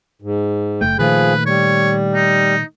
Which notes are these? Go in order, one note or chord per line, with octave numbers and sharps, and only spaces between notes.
G#2
F#1 A3 G5
A#2 D#3 F3 A3 G#4 B4
G3 C#5
D#4